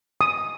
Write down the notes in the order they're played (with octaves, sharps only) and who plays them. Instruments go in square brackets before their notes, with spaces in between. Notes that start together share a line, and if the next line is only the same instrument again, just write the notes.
[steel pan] D#6